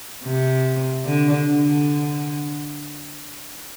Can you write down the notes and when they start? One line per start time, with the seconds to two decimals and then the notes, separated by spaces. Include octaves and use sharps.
0.24 C3
1.05 D3
1.46 D3